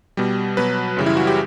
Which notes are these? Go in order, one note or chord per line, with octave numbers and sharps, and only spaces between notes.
B2 G3
B2 F#3 B4
F#2 C#3 E3 G3
E4
F#4
G4